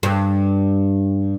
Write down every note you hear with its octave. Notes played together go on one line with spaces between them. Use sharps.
G2